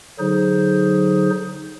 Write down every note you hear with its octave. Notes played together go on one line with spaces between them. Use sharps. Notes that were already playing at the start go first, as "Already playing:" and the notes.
D3 F#3 D#4 G#4 C5